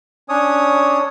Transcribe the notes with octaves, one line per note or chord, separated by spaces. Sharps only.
C#4 D4 C#5 D#6